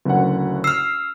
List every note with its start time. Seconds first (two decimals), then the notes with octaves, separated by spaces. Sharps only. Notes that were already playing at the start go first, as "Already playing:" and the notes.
0.05 F#1 D2 F#5
0.64 E6 F6 C7